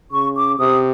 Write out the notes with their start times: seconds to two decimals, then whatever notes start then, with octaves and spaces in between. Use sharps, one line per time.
0.12 C#3 C#6
0.36 D6
0.59 C3 D#6